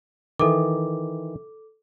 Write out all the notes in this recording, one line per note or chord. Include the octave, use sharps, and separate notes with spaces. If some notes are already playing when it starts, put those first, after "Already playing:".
D#3 E3 A4 D6